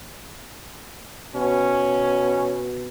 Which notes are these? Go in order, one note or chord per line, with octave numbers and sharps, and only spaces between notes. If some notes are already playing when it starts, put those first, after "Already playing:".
B2 C#4